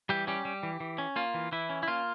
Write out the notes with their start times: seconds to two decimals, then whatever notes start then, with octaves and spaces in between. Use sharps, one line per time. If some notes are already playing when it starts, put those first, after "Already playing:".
0.09 E3 G3 G4
0.27 G3 C#4 G4
0.45 G3
0.63 E3
0.80 E3
0.98 C#4
1.16 A#3 F4
1.34 E3
1.52 E3 E4
1.70 C#4
1.83 E4
1.88 A#3 F4